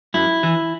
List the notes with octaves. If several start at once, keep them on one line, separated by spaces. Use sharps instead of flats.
F#2 E4
E3